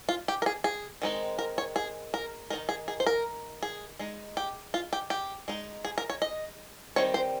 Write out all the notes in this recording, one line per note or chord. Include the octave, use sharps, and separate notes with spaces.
F4
G4
A#4
G#4
G#4
D#3 G#3 C4 D#4
A#4
C#5
G#4
A#4
D#3 A#3 D#4 A#4
G#4
G#4
C5
A#4
G#4
G#3 D#4
G4
F4
G4
G4
G#3 D#4
G#4
A#4
C#5
D#5
D#3 G3 C4 C#5
C5